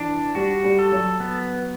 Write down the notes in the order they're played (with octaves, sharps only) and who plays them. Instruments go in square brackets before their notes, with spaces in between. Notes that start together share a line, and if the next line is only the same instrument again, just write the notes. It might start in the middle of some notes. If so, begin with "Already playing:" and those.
Already playing: [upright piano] E3 [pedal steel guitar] D4
[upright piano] G3 [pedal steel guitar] F#4
[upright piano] G3
[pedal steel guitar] A4
[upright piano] F#3
[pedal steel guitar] B3